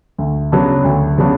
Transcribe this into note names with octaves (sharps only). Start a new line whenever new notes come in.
D2
C#3 F#3 B3 D4
D2
C#3 F#3 B3 D4